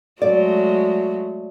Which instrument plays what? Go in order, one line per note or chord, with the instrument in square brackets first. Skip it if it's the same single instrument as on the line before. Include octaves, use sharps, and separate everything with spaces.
[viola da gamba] F#3 G#3 A3 [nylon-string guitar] D5